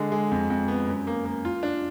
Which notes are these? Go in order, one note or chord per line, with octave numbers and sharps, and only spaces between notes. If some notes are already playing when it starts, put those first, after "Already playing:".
Already playing: D3 G#3
G#3
F2
F2
B3
F#2
A#3
A#3
F4
D4